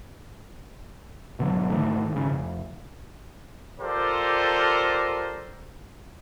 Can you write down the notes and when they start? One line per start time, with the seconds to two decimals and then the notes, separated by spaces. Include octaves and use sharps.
1.39 G#1 B2 D3 F#3
1.70 G#2 D#3 A3
2.11 G#1 C#3
2.28 F1
3.79 F4 G4 A4 A#4 C5 D5